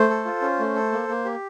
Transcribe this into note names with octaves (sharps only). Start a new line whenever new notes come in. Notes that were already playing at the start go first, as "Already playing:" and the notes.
Already playing: A3 C5
A4
F4
C#4
A3
A4
A#3
A#3
G4